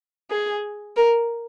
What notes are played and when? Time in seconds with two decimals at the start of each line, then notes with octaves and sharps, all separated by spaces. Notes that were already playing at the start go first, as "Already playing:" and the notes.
0.30 G#4
0.96 A#4